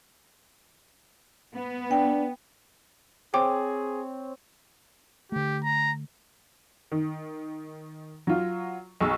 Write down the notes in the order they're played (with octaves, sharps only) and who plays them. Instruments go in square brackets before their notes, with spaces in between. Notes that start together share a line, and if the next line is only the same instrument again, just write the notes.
[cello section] B3
[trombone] D4 [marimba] G5
[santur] C4 C#5 [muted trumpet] G#4 [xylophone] G5 D6
[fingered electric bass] D3 A3 [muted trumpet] G4
[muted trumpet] A#5
[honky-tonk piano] D#3
F#3 F4
B1 G#4 C#6 E6